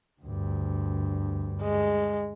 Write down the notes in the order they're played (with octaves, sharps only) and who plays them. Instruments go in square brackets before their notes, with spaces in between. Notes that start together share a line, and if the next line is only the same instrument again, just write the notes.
[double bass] D2 G2
[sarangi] G#3